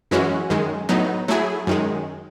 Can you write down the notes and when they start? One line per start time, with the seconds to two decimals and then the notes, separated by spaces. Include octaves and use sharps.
0.11 F#2 E3 G#3 C#4 F#4
0.50 F#2 D#3 G#3
0.89 A2 F#3 B3 D#4
1.28 F#3 A3 E4 G#4
1.67 F#2 D#3 G#3